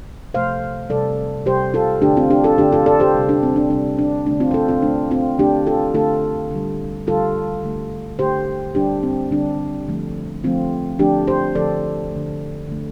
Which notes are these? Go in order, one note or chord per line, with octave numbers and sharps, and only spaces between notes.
C3 F3 A3 C5 F5
C3 G3 A4 D5
C3 G3 G4 C5
F4 A4
D3 A3 D4 G4
C4 F4
D4 G4
F4 A4
D3 A3 D4 G4
F4 A4
A4 D5
G4 C5
C3 G3
D4 G4
C4
D4
C3 G3 D4
D4
D3 A3 D4
C4 F4
C5
F4 A4
C4 F4
D3 A3 D4
C4 F4
D3 A3 D4 G4
F4 A4
D3 A3 F4 A4
D3 G3
D3 G3 F4 A4
D3 A3
D3 A3 G4 C5
D3 G3 D4 G4
C4
D3 G3 D4
D3 F3 A3
D3 F3 A3 C4 F4
D3 F3 A3 D4 G4
G4 C5
D3 F3 A3 A4 D5
D3 A3
D3 A3